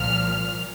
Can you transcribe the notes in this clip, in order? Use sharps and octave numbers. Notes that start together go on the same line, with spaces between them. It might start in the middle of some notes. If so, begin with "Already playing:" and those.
Already playing: C2 A#2 F3 F6